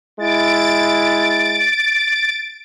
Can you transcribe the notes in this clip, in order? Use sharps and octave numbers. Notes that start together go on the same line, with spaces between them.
G#3 E4 A6 D7